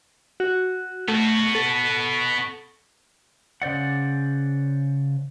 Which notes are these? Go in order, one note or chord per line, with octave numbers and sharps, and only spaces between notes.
F#4
A3 B3 F#4
A4
C#3 C5 D5 F#5